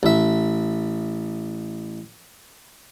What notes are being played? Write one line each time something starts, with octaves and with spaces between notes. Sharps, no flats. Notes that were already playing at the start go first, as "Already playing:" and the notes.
A1 E5